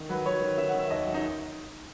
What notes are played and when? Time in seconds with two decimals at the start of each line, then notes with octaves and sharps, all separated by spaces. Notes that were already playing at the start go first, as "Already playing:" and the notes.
Already playing: D#3
0.09 F#3 B4
0.25 F#3 C#5
0.42 D#3
0.58 D#3 E5
0.68 F#5
0.74 D#3 E5
0.90 D#2 D#5
1.06 F#3
1.14 D#4